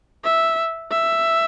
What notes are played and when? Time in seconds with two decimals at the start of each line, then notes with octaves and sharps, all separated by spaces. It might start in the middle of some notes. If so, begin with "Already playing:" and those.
0.24 E5
0.91 E5